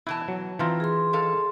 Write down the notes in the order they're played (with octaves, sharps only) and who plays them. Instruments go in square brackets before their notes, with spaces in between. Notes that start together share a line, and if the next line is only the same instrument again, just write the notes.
[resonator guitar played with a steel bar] B2 E3 A5 [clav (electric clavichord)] E4
[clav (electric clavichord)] F#3
[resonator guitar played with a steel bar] D#3 C4 [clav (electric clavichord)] E3 F4 A#5
[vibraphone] G#4 C6
[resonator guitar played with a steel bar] D#3 A4 F5